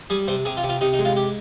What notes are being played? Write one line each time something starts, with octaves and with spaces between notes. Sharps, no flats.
G3 G#4
C3 C5
C3 G#4
F4
C3
F4
C3 D#4
D#4
G#3
F4
G4